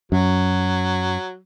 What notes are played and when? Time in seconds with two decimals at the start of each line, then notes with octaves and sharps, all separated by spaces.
0.12 F#2 F#3